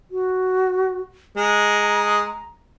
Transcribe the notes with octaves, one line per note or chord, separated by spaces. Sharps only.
F#4
G#3 A#5